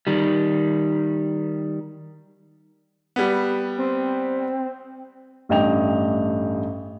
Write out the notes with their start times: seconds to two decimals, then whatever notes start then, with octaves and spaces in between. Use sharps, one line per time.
0.07 D#3 G3
3.16 G3 B3
3.78 C4
5.49 A1 G2 A3 D#5 G5 F7